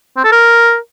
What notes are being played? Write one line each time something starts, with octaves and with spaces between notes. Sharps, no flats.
C4
A4
A#4